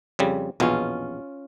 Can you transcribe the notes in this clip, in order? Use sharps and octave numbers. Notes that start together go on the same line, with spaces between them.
F2 C#3 G3
A#1 E2 B2 C#4 F4